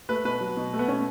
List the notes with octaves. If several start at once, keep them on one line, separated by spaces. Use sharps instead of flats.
A3 B4
B2 B4
F#3
B2
A3
B3
B2 C#4